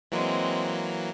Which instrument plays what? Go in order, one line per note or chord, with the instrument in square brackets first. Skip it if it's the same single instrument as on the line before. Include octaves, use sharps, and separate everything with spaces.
[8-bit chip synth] E3 F#3 A#3 [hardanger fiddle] G#3 C4